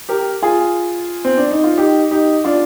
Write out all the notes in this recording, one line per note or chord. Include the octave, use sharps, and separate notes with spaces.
G4 A#4
F4 G#4
C4
D4
D#4
F4
D#4 G4
D#4 G4
D4 F4